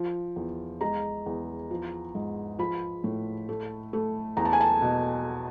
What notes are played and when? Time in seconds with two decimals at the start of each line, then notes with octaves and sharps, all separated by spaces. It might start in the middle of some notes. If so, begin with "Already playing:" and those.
Already playing: F3
0.36 E2
0.81 G#3 A#5
1.26 E2
1.71 F3
2.15 G#2
2.59 F3 B5
3.04 A2
3.49 A3
3.93 A3
4.37 E2 A#5
4.45 A5
4.53 G#5
4.61 A5
4.82 B2